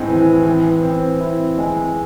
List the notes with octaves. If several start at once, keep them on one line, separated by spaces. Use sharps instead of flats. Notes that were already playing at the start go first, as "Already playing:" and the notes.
Already playing: A2 G#3 C4
E3
E3
C4
E4
G#3